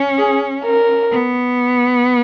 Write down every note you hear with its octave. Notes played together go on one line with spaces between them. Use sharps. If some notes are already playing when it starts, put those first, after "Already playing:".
Already playing: C#4
G#4
A#4
B3